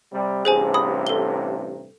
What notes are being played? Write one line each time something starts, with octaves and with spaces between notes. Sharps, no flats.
C3 G3
A1 G2 C3 G#4 C5 G#5
B5 D#6
A4 G7